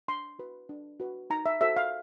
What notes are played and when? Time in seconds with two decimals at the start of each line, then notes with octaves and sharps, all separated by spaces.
0.08 D4 C6
0.39 F#4 B4
0.69 D4
1.00 F#4 B4
1.30 D#4 A#5
1.46 E5
1.61 F#4 A4 C5 E5
1.76 F5